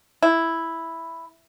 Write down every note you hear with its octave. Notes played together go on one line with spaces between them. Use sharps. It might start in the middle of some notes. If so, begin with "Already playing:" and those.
E4